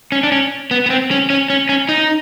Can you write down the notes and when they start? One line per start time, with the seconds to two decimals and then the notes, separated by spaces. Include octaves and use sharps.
0.12 C#4
0.23 D4
0.32 C#4
0.71 B3
0.86 B3
0.90 C4
1.11 C#4
1.30 C#4
1.50 C#4
1.69 C#4
1.89 D#4